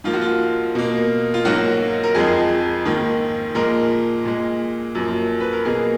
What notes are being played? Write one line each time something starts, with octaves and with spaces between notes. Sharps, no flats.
G#2 F3 A#3 F4
F#4
F4
B2 A#3
F4
G#2 F#3 A#3 F#4
A#4
F2 F3 G#3 G#4
G#2 D#3 A#3
A#2 F3 G#3 A#4
A#2 G#3
F#2 F3 A#3
B4
A#4
B2 A#3 G#4